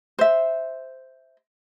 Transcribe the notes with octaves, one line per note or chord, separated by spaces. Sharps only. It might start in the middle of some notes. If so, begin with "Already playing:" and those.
C5 E5